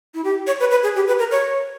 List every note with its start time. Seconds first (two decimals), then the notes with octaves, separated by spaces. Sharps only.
0.14 E4
0.24 G4
0.47 C#5
0.60 B4
0.71 B4
0.83 G#4
0.96 G4
1.08 B4
1.19 A#4
1.31 C#5